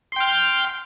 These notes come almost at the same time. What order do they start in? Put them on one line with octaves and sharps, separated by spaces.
C6 G5 F6